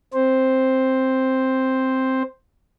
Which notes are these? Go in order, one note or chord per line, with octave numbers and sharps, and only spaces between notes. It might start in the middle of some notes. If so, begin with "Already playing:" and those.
C4 C5